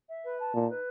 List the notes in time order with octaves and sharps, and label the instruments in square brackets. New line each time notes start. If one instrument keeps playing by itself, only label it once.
[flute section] E5
B4
A5
[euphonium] A#2 [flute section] D#4
[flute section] B4